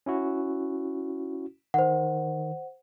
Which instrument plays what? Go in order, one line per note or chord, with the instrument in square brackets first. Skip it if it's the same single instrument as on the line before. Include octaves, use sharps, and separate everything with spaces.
[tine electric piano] C#4 E4 F#4
[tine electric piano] D#3 [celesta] C5 F#5